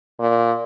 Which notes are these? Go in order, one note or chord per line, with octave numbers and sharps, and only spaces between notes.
A#2